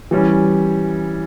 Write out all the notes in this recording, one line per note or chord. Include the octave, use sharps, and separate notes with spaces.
E3 G3 C#4